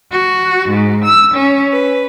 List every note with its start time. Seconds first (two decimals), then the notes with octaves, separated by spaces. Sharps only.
0.10 F#4
0.69 G#2
1.05 E6
1.35 C#4
1.73 B4